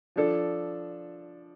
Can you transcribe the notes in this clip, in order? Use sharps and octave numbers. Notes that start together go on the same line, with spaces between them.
F3 D4 A4